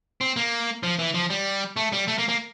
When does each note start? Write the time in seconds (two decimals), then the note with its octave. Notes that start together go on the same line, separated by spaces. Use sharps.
0.21 C4
0.36 A#3
0.83 F3
0.99 E3
1.14 F3
1.30 G3
1.76 A3
1.93 G3
2.08 A3
2.18 A#3
2.29 A#3